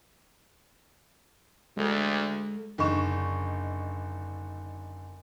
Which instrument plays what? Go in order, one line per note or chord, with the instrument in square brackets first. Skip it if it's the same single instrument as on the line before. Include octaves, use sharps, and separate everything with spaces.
[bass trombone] D2 [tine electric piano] G#3 A4
[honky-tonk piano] F#1 D3 D#4 C#6 E7